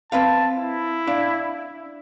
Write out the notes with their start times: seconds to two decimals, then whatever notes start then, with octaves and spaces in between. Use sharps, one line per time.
0.12 C4 B4 F5 A5
0.57 E4
1.07 D4 F5